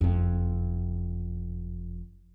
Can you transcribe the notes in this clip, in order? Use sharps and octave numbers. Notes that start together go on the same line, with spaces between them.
F#1 F2